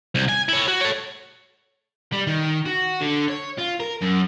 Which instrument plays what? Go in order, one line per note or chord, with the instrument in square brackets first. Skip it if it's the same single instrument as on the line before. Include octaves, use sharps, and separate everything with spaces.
[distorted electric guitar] C2
G#5
E4 C#5
F#4
A4 C#5
[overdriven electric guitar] G3
D#3
F#4
D3
C#5
F4
A#4
F#2